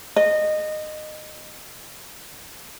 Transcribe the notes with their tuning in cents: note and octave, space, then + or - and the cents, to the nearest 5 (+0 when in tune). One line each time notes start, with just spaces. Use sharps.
D#5 -20